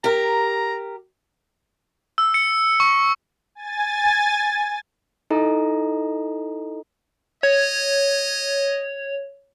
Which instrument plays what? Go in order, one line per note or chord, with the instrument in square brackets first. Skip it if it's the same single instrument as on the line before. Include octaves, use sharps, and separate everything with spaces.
[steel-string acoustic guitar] G4 A#4 [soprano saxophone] A#5
[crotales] E6
C#7
C#6
[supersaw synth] G#5 A6
[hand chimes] D#4 E4 A4 D#5 A#5
[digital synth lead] C#5 [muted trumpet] D#5